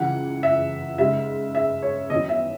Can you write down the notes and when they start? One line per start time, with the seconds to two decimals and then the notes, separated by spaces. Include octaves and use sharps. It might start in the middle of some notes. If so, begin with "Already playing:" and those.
Already playing: C#2 C#3 E3 F#5
0.43 E5
0.98 C#3 G#3 D#4 E5
1.55 E5
1.83 C#5
2.10 E2 D#3 F#3 C#4 E4 D#5
2.29 E5